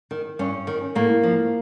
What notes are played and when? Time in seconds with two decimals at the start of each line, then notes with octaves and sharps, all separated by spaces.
0.11 D#3
0.39 G2 C#4
0.67 D#3
0.95 A2 A#3
1.23 F3